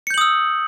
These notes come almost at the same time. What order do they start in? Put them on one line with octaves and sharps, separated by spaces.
C#7 G6 F#7 D#6 E6